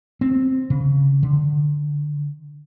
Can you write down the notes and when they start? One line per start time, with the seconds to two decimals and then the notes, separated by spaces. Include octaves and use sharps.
0.21 C4
0.70 C#3
1.23 D3